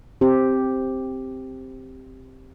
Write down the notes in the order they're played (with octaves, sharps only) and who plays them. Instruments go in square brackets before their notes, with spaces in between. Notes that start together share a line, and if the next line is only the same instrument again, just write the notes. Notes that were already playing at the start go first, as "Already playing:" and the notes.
[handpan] C4 G4